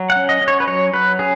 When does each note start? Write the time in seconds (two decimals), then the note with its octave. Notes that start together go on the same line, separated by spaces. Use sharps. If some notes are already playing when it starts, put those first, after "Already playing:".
Already playing: F#3
0.10 F#5
0.16 C#4
0.29 D#5
0.41 C#4
0.48 C#5
0.60 B4
0.67 F#3 C#5
0.93 F#3 B4
1.19 C#4 G#4